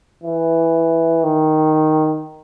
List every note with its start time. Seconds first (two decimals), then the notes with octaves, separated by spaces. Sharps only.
0.23 E3
1.24 D#3